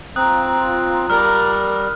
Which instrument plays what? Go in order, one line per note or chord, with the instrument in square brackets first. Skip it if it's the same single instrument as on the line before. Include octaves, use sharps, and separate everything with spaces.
[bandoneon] C4 [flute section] F4 A#5 [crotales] D#6 F#6
[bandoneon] G3 [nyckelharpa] A#4 D5 [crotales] F6